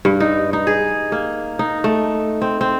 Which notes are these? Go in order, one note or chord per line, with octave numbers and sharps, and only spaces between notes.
G2
D#4
D#4
G#4
A#3
D#4
A3
C4
C4